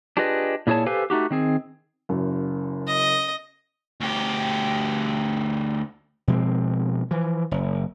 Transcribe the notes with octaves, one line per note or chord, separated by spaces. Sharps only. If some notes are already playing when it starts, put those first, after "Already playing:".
D4 F4 G4 G#4 B4 D#5
A#2 E4 G#4 C#5 A5
G4 A4 B4 C5 F5 G#5
A3 D#4 F#4 G4
D#3 C4 G#4
F#1 F#2
D#5
D2 G4
B2 F3 G#3 C4
E3 F3
F#1